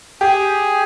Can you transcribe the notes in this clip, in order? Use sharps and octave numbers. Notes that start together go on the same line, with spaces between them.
G4 G#4